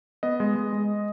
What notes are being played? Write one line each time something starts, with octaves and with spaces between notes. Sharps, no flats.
B3 D#5
G#3
G#3
G#3